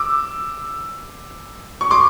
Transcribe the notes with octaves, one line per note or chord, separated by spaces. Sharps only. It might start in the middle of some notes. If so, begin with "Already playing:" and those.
Already playing: D6 E6
C#6
C6 D6